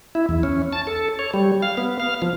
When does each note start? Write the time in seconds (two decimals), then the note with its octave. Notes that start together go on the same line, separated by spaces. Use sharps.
0.15 E4
0.29 E2
0.43 C#4
0.73 A5
0.87 A4
1.19 C#5
1.34 G3
1.62 F5
1.77 B3
2.00 F5
2.22 F3